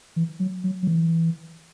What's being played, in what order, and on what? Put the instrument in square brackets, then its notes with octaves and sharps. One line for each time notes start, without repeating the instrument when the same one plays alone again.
[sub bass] E3
F#3
F#3
F#3
E3